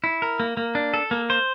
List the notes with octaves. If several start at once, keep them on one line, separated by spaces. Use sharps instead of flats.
E4
A#4
A#3
A#3
D4
A4
A#3
C5